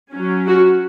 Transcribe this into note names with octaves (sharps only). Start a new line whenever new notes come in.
F#3 C#4
F#4